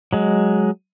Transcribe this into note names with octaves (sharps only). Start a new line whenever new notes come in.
F#3 G#3